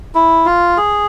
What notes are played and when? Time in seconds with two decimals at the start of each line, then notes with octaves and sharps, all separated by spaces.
0.15 E4
0.46 F4
0.77 G#4